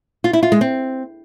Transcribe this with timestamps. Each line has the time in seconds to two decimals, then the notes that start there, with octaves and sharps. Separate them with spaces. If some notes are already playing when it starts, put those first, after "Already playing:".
0.24 F4
0.33 E4
0.43 F4
0.52 G#3
0.61 C4